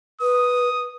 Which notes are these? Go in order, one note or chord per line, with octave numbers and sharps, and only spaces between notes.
B4 D#6